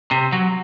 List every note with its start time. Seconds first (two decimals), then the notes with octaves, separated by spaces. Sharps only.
0.11 C3
0.32 F#3